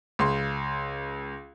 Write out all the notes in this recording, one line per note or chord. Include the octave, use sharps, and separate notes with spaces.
C#2 C6